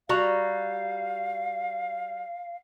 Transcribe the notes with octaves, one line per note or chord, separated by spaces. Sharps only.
G3 F#4 F5 A#5